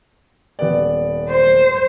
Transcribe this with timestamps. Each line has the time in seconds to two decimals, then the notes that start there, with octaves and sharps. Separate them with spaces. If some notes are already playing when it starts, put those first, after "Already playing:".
0.59 D#1 B3 D5
1.29 C5